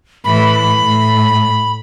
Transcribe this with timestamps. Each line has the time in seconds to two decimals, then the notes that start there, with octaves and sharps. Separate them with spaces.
0.24 A2 E3 B5
0.80 A2